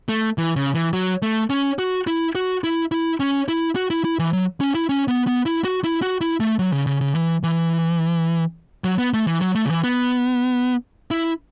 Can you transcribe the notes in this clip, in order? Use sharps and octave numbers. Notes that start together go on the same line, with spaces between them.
A3
E3
C#3
E3
F#3
A3
C#4
F#4
E4
F#4
E4
E4
C#4
E4
F#4
E4
E4
E3
F#3
C#4
E4
C#4
B3
B3
E4
F#4
E4
F#4
E4
A3
F#3
C#3
C#3
C#3
E3
E3
F#3
B3
A3
E3
F#3
A3
C#3
E3
B3
E4